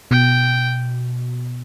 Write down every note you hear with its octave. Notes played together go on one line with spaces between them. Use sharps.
B2 G5